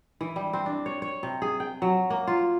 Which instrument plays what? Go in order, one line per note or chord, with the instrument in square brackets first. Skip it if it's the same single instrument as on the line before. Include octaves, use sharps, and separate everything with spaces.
[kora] E3
G3
C4
D4
C#5
C#5
C3
G#4
G5
F#3
A#3
F4